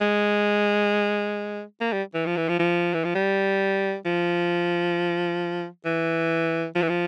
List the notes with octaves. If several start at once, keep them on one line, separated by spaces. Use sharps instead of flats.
G#3
A#3
G3
E3
F3
E3
F3
F3
E3
F3
G3
F3
E3
F3
E3
F3